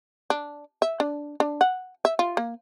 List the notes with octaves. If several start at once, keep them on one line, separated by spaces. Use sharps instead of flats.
D4
E5
D4
D4
F#5
E5
F4
A#3